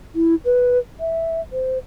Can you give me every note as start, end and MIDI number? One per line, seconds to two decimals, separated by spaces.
0.15 0.35 64
0.45 0.78 71
1.00 1.41 76
1.52 1.78 72